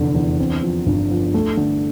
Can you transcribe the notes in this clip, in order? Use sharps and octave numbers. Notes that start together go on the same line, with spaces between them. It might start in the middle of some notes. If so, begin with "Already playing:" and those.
Already playing: F1 E2 D3
E2
C4
F3
G1
F3
A3
D3